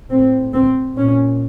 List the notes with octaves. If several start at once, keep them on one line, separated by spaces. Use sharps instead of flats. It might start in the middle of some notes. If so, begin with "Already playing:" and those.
A2 C4
C4
A#2 C#4